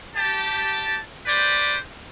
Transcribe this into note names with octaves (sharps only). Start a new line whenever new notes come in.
G4 A5
G4 B4 C5 D5